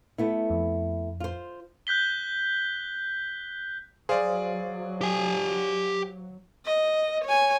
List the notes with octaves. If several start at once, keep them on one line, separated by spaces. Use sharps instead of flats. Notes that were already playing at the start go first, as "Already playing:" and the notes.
A3 B3 E4
F2
F4 C5
F#6 G6 B6 G7
F#3 G#4 C5 D5 F5
G4 G#5
D#5
C#5 G#5